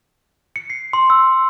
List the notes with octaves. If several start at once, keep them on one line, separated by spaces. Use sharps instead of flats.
C#7
C7
C6
E6